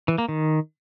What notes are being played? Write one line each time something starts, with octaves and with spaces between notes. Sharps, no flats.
E3
A#3
D#3